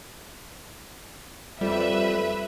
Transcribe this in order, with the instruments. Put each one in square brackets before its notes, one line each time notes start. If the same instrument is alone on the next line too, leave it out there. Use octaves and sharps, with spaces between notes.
[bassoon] F2 [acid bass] G3 [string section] B4 E5